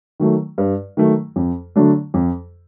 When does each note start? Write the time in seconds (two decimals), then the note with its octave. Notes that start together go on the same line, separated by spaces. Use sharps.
0.20 D#3 F#3 A3
0.58 G2
0.97 D#3 F#3 A3
1.36 F2
1.76 D3 F#3 A3 D4
2.14 F2